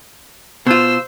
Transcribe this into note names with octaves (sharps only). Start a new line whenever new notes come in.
B2 F4 C5 E6